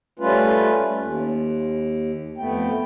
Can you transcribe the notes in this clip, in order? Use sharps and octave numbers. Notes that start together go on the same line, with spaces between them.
G3 A3 C#4 F4 B4
D#2
F2 A3 B3 G5